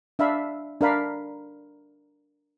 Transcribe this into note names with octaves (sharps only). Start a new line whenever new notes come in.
D4 E5 F5 B5
D4 A#4 F5 B5